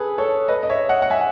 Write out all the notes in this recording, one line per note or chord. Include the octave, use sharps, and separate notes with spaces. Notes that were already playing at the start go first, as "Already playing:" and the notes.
Already playing: G#4 A4 B4
A4 C#5
B4 D#5
D#5
C#5 E5
D#5 F#5
F#5
E5 G#5